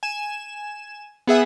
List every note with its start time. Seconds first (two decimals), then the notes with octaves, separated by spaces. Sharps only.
0.03 G#5 E7
1.27 B3 G#4 E5 F#5